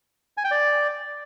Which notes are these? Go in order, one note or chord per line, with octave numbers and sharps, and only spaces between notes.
G#5
G5
D5